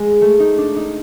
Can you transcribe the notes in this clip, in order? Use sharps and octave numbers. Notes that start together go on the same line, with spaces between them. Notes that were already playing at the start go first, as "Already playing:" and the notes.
Already playing: G#3
A3
D#4
D4
D#4